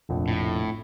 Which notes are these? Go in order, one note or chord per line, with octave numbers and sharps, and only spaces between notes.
F1 A#1
A2